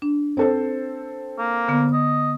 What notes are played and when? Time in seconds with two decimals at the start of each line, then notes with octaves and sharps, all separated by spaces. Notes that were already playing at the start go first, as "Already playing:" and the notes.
0.02 D4
0.37 C4 A4 C5
1.38 A#3
1.68 D3 B3
1.92 D#5